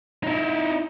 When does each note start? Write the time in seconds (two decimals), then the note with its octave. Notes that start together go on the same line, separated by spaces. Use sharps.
0.24 D#4 E4